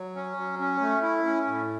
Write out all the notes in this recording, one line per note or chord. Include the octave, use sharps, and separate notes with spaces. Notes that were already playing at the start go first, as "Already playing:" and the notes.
Already playing: F#3
C#4
F#3
C#4
A3
E4
C#4
A2